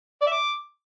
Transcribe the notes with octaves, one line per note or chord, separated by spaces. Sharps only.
D5
E5
D6